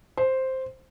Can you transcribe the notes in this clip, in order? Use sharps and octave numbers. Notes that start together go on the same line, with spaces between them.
C5